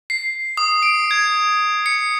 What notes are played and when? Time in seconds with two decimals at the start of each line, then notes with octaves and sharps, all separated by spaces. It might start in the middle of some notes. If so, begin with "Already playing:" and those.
0.10 C7
0.57 D#6
0.83 D7
1.11 G#6
1.86 C#7